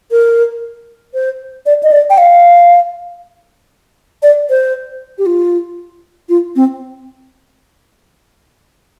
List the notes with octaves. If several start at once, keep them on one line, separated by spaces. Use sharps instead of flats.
A#4
C5
D5
D#5
D5
G5
F5
D5
C5
G4
F4
F4
C4